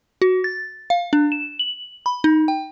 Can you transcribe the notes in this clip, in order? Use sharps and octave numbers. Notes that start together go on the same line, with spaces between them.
F#4
A6
F5
D4
E7
F#7
B5
D#4
G5